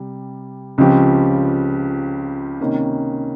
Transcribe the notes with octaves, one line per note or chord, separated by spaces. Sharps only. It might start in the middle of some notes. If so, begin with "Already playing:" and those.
Already playing: C3 G3
C#2 C#3 F3 C4 G4
C3 D#3 A#3 C#4